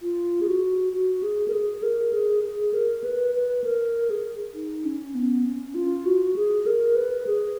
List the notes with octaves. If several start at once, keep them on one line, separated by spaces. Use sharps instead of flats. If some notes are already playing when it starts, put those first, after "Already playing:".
F4
G#4
F#4
F#4
G#4
A#4
G#4
A#4
G#4
G#4
A#4
B4
B4
A#4
G#4
D#4
C#4
B3
C#4
F4
F#4
G#4
A#4
B4
G#4